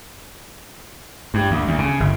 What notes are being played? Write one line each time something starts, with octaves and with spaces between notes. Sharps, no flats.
G2
D2
D2
C#3
G1